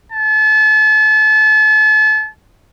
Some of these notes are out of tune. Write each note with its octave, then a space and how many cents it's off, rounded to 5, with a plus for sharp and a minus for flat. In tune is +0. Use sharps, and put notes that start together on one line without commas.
A5 -35